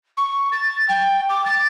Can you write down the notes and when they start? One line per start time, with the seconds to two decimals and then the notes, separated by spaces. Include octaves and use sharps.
0.17 C#6
0.52 A6
0.89 G5
1.29 D6
1.46 A6